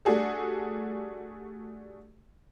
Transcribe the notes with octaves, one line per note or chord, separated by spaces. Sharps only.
G3 A3 D4 F#4 G#4 A4